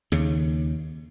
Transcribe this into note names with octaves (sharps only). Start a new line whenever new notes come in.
D#2 C#3